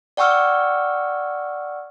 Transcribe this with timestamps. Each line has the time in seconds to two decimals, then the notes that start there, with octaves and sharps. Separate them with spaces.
0.17 D5 F#5 G5 C#6 E6 F6